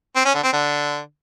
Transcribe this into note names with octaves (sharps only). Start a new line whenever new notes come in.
C4
C#4
D3
C4
D3